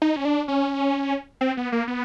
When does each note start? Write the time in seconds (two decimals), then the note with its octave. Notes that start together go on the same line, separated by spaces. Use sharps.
0.02 D#4
0.16 C#4
0.25 D4
0.48 C#4
1.41 C4
1.57 B3
1.72 A#3
1.88 B3